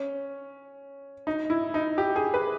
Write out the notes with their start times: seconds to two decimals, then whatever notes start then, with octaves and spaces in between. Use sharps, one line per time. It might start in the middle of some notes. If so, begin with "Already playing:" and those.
Already playing: C#4
1.27 D#4
1.50 E4
1.74 D#4
1.98 G4
2.16 G#4
2.34 B4